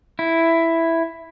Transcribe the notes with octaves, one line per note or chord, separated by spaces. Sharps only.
E4